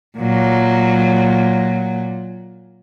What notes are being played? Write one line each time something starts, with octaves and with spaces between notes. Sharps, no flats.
A#2 F#3